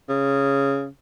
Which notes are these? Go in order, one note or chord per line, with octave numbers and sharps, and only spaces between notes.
C#3